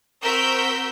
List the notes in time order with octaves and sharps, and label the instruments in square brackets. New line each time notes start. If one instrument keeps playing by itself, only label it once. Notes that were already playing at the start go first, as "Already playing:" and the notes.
[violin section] C4 F#4 A#4 E6 G6 B6